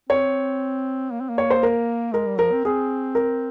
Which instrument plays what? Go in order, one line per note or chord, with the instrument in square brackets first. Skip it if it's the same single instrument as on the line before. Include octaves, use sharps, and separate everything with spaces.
[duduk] C4 [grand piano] C#5
[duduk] A#3
C4
A#3
[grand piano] C#5
C5
A#4
[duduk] G#3 [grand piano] A#4
[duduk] G3
[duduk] F3 [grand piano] A#4
[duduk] C4
[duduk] C4 [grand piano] G#4
[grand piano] A#4